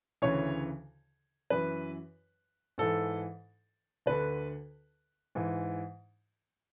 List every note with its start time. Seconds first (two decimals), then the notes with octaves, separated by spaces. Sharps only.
0.22 D2 C#3 E3 C#5
1.50 F#2 E3 B4
2.78 G#2 E3 A4
4.06 D2 D3 B4
5.35 G#2 E3